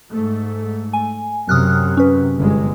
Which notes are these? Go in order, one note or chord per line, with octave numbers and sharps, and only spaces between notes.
G#2 A3
G#5
F#2 C3 D#6 F6 F#6
C#4 B4
G1 G#3